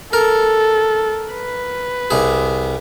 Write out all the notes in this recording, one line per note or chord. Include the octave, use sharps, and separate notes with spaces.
A4 A#4
B4
C2 G#4